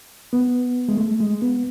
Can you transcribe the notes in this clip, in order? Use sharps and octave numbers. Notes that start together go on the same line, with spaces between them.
B3
G#3
A3
G#3
B3